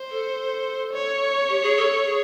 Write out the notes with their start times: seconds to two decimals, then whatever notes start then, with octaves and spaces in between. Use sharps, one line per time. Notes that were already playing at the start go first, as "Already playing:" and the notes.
Already playing: C5
0.10 A4
0.93 C#5
1.49 G4
1.62 G#4
1.77 A4
1.91 A4
2.05 G#4